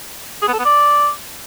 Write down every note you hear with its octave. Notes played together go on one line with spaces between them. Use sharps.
G#4
B3
A4
B3
D5